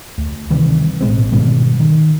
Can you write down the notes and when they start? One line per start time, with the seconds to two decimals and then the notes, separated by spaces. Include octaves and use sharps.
0.18 D2
0.50 C3 D#3 E3 G3
1.01 A1 B2 G#3 C4
1.32 G#2 B2 D#3 G3
1.80 D#3